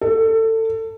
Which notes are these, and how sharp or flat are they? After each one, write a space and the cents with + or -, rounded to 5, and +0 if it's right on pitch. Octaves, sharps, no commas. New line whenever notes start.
A4 +25